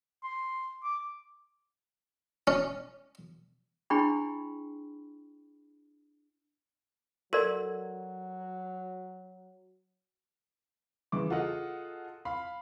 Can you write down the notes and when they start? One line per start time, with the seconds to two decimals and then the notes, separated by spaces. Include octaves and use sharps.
0.24 C6
0.84 D6
2.47 C#4
3.90 D4 E4 G#4 G5 B5 C#6
7.33 F#3 F#4 A4 A#4 D5
11.12 C#3 E3 D6
11.30 F4 F#4 G#4 A4 D#5 F#5
12.25 F5 B5